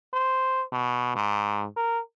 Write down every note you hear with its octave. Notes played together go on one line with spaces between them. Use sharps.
C5
B2
G#2
A#4